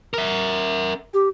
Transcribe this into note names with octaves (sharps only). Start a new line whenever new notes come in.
A#4 E5
G4